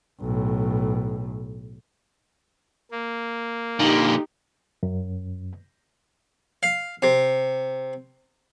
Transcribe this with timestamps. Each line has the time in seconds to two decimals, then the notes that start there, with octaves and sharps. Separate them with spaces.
0.20 B1 A2
2.91 A#3
3.79 A#2 D3 D#4 G4
4.83 F#2
6.63 F5
7.02 C3